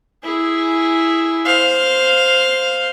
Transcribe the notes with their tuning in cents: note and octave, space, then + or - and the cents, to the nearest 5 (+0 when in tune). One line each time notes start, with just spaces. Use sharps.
E4 +0 G#4 +0
C5 +0 F5 +5